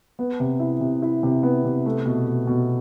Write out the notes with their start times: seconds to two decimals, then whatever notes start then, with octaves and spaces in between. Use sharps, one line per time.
0.19 B3
0.40 C3
0.60 E4
0.81 C3
1.02 E4
1.23 C3
1.43 B3
1.65 C3
1.86 A3
2.06 B2
2.27 B2
2.47 B2